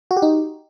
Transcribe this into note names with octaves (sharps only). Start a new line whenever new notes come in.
F#4
G4
D#4